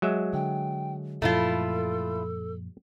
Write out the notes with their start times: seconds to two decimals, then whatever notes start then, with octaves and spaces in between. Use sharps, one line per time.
0.02 F#3 G#3 E5
0.33 D3 G5
1.22 F#2 A#2 F3 A3 E4 F4 A4